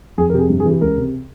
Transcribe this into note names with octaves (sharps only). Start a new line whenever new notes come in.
F2 G#4
A#4
C3 G4
G#4
G2
G#4
E3
G4
C#2 A#4
C3